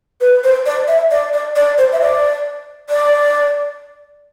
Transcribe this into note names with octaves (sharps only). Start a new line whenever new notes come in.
B4
C5
D5
E5
D5
D5
D5
C5
E5
D5
D5